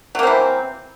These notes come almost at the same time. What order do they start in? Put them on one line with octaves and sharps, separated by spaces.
F#3 A#3 C4 E3